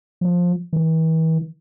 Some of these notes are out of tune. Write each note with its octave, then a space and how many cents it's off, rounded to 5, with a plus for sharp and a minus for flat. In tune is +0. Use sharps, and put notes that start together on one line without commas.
F3 +15
E3 -40